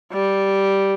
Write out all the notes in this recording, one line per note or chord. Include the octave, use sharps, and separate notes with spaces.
G3